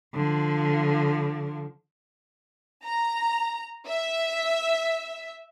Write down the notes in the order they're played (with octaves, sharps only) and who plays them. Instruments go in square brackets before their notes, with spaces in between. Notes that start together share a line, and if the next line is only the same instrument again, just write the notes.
[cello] D3 F3
[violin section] A#5
E5